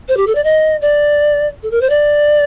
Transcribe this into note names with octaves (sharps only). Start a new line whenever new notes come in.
C5
G4
A4
D5
D#5
D5
A4
A#4
C5
D5